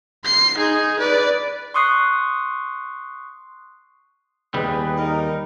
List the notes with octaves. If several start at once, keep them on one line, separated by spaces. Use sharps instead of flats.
C6 C7
D#4 G#4
B4 D5
C6 C#6 D#6 F#6 C7
D#2 G3 G#4 B4
D#4 A#4